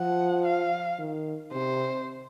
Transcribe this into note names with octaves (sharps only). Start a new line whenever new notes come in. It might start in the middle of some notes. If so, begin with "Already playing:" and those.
Already playing: F3 F#5
F5
D#3
C3 C5